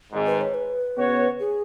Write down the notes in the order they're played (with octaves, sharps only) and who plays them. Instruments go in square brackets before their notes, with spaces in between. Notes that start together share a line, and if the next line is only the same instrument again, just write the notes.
[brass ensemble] G#1 G#2 G#3
[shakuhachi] B4
C#5
B4
[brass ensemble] C#3 B3 F#4 C#5
[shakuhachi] G#4